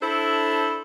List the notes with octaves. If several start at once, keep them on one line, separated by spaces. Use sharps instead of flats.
D4 E4 A4 C5